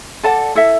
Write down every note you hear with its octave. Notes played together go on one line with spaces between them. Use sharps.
A4 D5 F#5 A5
E4 A4 E5